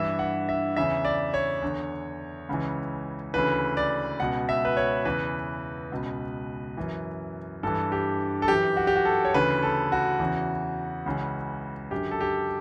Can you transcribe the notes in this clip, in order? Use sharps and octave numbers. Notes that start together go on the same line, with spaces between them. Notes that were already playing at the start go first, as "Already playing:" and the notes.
Already playing: G2 E3 E5
F#5
E5
E2 C#3 E3 E5
D5
C#5
E2 D3
C#2 C#3 E3
D2 C#3 E3 B4
D5
C#2 B2 F#5
E5
B4
C#5
E2 C#3 E3 B4
C#2 B2
F#2 E3
G2 E3 A4
G4
A4
F#2 E3 G4
F#4
G4
F#4
A4
C#5
D2 C#3 E3 B4
A4
F#4
E2 C#3 E3
C#2 C#3 E3
F#2 D3 G4
A4
G4